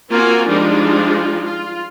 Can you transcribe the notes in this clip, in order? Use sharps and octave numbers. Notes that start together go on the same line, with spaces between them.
A#3 C4 F4 F#4 A#4 G#5
F3 G3 G#3 D4 D#4 F4
F4